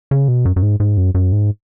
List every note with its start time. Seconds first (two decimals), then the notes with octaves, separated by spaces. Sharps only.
0.11 C#3
0.28 B2
0.45 F#2
0.56 F#2
0.62 G#2
0.80 G#2
0.97 F#2
1.15 F#2
1.32 G#2